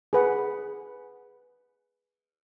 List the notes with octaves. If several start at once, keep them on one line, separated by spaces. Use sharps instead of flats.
G#4 B4 F#5